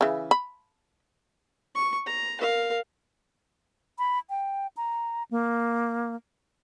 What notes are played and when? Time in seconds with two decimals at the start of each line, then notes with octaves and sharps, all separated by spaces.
0.01 C#3 E3
0.31 B5
1.75 C#6
2.07 A#5
2.40 A#4 F5
3.99 B5
4.30 G5
4.77 A#5
5.31 A#3